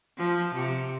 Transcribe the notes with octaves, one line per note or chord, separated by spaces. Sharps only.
F3
C3